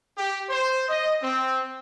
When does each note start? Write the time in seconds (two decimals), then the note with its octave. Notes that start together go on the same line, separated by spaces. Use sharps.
0.17 G4
0.49 C5
0.88 D#5
1.22 C4